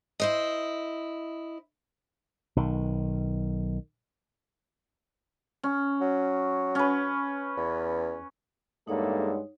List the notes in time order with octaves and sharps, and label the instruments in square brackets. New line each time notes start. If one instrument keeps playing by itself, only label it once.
[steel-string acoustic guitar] E4 C5 D#5
[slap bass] B1 D#3
[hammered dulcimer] C#4
[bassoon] F#3
[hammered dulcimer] C#4 B4
[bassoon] E2
[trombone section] E2 A#3 A4 [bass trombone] G2 [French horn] G#3 [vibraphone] D#4 C#5 F#5